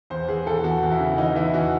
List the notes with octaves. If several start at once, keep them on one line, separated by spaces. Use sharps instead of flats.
E2 C5
E3 G#4
E2 A4
E2 F#4
E2
E4
C#3
E3 D#4
E3 E4
E2 F#4